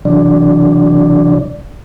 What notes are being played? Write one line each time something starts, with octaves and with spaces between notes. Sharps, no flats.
C3 E3 F#3 D4 D5